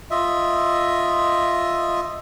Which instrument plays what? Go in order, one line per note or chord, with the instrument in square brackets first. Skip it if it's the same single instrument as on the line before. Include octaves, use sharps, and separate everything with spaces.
[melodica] F4 D#5 E5